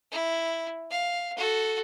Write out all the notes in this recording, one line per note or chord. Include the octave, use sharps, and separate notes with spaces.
E4
F5
F#4 A4